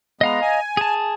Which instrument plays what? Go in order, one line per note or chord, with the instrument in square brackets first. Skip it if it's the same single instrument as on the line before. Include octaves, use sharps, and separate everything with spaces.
[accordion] G#3 B3 [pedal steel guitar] D#5 F5 A#5
[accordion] G#5
[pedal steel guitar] G#4 A5